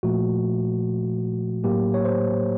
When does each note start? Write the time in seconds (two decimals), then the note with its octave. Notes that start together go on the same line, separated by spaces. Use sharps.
0.03 A#2 F3 A3 F#4
1.64 A2 F#3 A#3 G4
1.94 C#5
2.04 C5